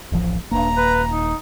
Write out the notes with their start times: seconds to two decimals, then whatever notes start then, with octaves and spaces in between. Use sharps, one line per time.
0.12 D1 A1 F3
0.51 D#1 C2 G2 A#3 A#5
0.77 B4
1.12 D#4